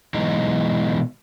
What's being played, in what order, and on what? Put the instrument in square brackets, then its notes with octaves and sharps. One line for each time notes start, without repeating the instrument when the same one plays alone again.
[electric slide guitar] B2 E3 F#3 G#3 D#4